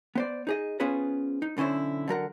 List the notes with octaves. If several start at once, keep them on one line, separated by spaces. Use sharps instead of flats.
B3 C5 D5
D#4 G#4 D#5
B3 C#4 F4 G#4 B4 C5
D#4
B1 D3 C#4 E4 C5
D3 F#3 A#4 F#5